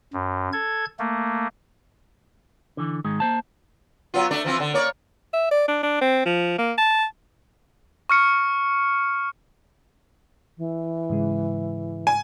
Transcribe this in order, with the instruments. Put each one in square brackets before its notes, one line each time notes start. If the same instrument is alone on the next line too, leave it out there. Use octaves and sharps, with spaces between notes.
[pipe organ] F#2
A4 G#6
A3 A#3
[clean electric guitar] D3 E3
G#2 D#3 G#3
A#3 C5 A5
[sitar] F#3 B3 F4
A3 D4 D5
E3 F3 C4
D3
A#3 C#5 D5
[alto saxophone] E5
D5
D4
D4
C4
F3
A#3
A5
[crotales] C#6 F6 C#7
[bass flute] E3
[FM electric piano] G#2 C#3 G#3
[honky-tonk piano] G#5